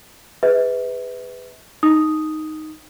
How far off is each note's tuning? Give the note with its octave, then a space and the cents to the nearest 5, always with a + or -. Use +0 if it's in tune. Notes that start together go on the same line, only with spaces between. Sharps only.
G#4 -20 B4 +15 E5 -40
D#4 +0 D#6 +0